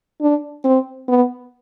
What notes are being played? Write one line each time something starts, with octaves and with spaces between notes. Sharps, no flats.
D4
C4
B3